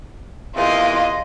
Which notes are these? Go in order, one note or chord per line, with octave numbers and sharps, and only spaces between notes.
E2 C3 A#3 F4 D#5